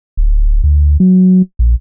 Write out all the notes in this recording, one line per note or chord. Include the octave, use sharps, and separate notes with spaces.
D1
D2
F#3
A#1